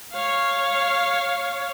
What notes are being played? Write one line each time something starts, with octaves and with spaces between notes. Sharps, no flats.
C#5 F5